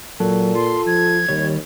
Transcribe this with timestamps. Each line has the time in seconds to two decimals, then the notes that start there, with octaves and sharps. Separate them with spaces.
0.20 A#2 F#3 A4
0.55 F4 C6
0.87 F3 G#6
1.29 D#2 D#3 G3 C#5